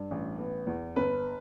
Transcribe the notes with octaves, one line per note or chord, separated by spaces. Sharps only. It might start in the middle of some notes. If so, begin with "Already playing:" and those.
Already playing: G2
A1
B3
E2
G1 B4